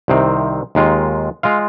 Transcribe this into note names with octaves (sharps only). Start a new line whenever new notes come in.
C2 C3 D#3 C4
D#2 D#3 G#3 F4
G#3 F4 F5